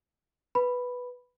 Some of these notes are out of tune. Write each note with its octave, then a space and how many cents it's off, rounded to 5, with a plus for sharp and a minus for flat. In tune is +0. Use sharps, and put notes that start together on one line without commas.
B4 +0 B5 +0